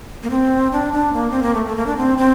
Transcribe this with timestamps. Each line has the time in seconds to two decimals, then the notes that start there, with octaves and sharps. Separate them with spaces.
0.23 A#3
0.30 C4
0.72 D4
0.93 D4
1.13 A#3
1.31 C4
1.43 A#3
1.55 A3
1.66 A3
1.76 A#3
1.87 D4
1.97 C4
2.18 C4